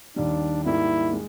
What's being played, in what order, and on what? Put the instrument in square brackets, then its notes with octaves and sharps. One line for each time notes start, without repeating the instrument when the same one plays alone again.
[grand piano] D#2 D#3 G3 [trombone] D4
[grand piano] G#2 D#3 G3 A#3 D#4 [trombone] E4
[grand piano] G#3